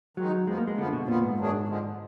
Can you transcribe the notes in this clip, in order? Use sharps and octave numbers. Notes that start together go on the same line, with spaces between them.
D#3 F#3 G#3 D#4
F2 F3 G#3 B3
A#3
G#3
F#2 D3 F3 B3
B2
F2 A#2 F3 B3
G#2
F#2 D#3 F#3 D4 G#4
D3 F3 G#3